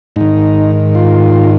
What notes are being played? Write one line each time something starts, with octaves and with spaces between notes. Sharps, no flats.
G#2 D#3 D#4
F4